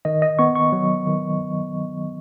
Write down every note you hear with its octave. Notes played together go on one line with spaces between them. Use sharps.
D#3 D#5
D#5
B3 C#6
C#6
F#3
D#3